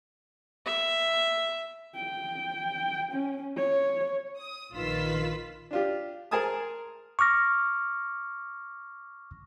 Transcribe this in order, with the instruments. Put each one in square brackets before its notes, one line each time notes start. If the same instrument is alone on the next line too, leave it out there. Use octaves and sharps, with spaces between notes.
[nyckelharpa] E5
[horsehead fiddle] G5
C#4
C#5
[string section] D#6
A#1 D#3 F4 B4 E6 B6
[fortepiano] D4 F4 G4
G#4 A#4 C5 G#5 A5 D#6
[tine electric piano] C#6 D6 F6 A#6